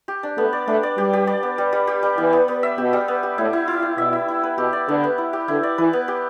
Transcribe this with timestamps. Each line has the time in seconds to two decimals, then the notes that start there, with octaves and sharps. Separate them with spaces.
0.08 G4
0.23 D4
0.37 A3 B3
0.53 D5
0.68 A3 D4
0.83 D5
0.98 G3 G4
1.13 G4
1.27 D5
1.43 B3
1.58 G3
1.73 G3
1.87 G4
2.03 G3
2.18 E3 B3
2.33 B3
2.48 B3
2.63 E5
2.77 B2 G4
2.93 G3
3.08 B3
3.23 G4
3.38 A2 E4
3.53 E4
3.68 E4
3.83 D5
3.97 B2 E5
4.13 E5
4.28 E4
4.43 B4
4.58 B2 G4
4.73 D5
4.88 D3 B3
5.04 B3
5.18 E4
5.33 G4
5.48 D3 E4
5.63 D5
5.78 E3 B4
5.93 B3
6.08 G4